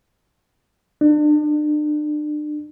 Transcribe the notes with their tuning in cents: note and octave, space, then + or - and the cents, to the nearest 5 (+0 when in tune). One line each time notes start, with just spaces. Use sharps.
D4 +35